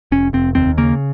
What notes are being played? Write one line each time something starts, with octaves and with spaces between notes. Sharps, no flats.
F1 C#4
F1 C4
D#2 C4
C#3 A#3